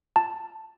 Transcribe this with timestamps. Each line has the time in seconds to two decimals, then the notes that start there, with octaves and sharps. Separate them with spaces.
0.16 A5